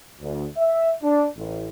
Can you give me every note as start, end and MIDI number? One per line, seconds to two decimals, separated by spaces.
0.19 0.44 38
0.56 0.89 76
1.01 1.23 62
1.35 1.67 33